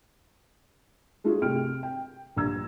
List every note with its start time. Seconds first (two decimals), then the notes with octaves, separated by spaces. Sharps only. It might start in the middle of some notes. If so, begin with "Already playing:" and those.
1.24 G#3 A3 D4 F4 F#4 G#4
1.42 C3 G5 F6 D7
1.83 G5
2.36 A#1 G2 A#5 E6 G#6